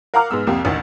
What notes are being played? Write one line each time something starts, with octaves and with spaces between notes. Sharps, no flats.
A#4 F5 F#5 A#5 D6 F6
G#2 G#3 B3 E6
C2 F2 A#3 G4
A1 D2 D#3